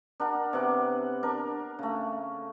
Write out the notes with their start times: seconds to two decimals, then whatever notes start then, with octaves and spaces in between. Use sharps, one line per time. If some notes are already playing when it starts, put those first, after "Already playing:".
0.20 D4 A#4 F#5
0.53 C3 B3 F#5 D6
1.23 D4 A#4
1.79 C#3 A3